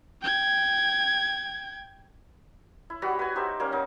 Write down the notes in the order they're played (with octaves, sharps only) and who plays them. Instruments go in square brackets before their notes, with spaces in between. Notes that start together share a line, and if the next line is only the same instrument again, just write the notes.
[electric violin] G5 G#6
[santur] E4
G3 B3 F#4 B5
B4 G#5
D#4 G4 C5 E5
G3 A#3 C#4 D#4
B3 D#4